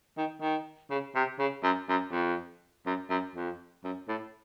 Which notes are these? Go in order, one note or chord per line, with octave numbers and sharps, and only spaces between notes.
D#3
D#3
C#3
C3
C#3
F#2
F#2
F2
F#2
F#2
F2
F#2
A2